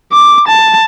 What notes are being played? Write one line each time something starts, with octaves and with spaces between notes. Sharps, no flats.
D6
A5